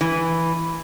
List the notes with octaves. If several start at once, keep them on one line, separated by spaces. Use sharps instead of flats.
E3